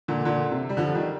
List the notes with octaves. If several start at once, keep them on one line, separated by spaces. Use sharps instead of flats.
A#2 D3
A#2 D3
C3
G3
D3 F3
D#3 G3